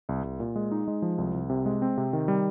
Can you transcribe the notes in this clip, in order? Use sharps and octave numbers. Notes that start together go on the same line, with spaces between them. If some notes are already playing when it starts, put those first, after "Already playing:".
C2
C2
A#2
G#3
D#4
G#3
F3
C2
C2
C3
G#3
C4
C3
D#3
G3